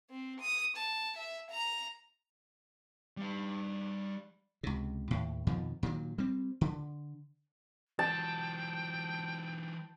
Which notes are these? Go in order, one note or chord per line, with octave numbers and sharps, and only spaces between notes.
C4
D#6
A5
E5
A#5
G3 F5
C#2 C3
D#2 A2
F2 B2 D#3 F3
A#2 D#3 F3 F#3
G3 C4
D3
E3 F#3 G5 A5